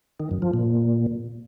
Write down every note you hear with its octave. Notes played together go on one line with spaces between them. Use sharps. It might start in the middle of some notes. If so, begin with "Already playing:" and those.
D#3
F#2
F3
A#2